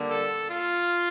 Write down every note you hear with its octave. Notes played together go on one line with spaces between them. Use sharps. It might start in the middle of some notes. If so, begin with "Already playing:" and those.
Already playing: D3 G3 A#3
A4
F4